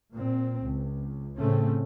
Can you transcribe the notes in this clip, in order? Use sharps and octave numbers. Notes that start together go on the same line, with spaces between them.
A#2 C4
C#2
A2 C#3 A3 C4 C#4